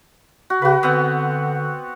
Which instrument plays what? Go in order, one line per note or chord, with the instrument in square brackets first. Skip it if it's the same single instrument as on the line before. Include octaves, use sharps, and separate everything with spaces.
[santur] F#4
[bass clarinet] C#3 [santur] F#4 B4
[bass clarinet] D3 [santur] B3 C4 F#5